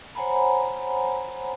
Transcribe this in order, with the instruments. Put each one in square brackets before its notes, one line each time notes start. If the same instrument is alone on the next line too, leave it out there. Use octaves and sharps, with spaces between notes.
[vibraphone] C5 C#5 F#5 G#5 A#5 B5